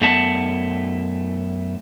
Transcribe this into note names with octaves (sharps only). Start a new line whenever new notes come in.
F#2 A3 B3 E5 F#5 A5